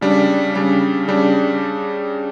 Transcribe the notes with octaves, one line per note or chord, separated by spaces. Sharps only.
C#3 G3 D4
C#3 G3 D4
C#3 G3 D4